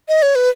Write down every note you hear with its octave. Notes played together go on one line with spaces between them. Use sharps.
D#5
C#5
B4